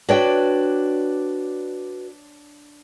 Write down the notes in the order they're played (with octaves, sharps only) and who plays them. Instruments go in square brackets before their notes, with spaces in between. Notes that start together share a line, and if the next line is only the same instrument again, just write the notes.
[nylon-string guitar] D4 C#5 G5 [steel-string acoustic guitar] F#4 B4 D5